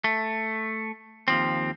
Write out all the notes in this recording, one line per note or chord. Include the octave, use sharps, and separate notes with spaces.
A3
D#2 F3 C4